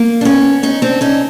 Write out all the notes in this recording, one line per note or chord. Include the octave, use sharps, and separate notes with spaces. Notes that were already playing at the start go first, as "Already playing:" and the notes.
Already playing: A#3
D4
B3 C#4
C#4 D#4
C4 D4
C#4 D#4